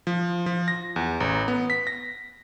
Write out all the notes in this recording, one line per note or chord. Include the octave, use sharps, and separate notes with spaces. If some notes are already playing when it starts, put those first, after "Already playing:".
F3
F3
A#6
E2
A1
B3
B6
A#6